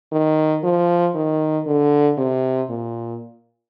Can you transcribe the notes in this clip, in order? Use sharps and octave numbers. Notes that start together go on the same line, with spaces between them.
D#3
F3
D#3
D3
C3
A#2